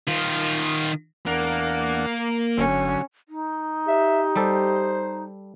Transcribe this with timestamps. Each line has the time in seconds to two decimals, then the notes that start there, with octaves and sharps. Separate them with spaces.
0.08 D#3 F4
1.27 E2 A#3 D4 F#5
2.58 G1 D3 F#3 C#4
3.29 D#4
3.88 G4 E5
4.36 G3 A4 C5